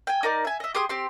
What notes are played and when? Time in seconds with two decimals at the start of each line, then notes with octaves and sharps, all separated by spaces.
0.07 G5 G#5
0.23 D#4 A#4 D5
0.45 E5 G#5
0.60 D#5 E5
0.75 G4 G#4 C6 D#6
0.89 C4 G4 C6